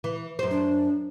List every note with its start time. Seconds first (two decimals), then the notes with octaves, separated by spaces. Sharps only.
0.04 E3
0.39 F#2 C5
0.51 D4